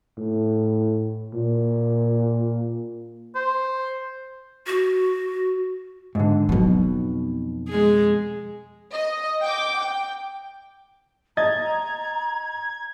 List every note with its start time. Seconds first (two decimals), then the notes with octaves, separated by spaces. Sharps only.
0.18 A2
1.34 A#2
3.35 C5
4.67 F#4
6.15 G#2 D3
6.49 F2 B2 F#3 D#4
7.68 G#3 G#4
8.94 D#5
9.42 G5 D6
9.78 G5
11.37 D#5 A#5 G#6 A6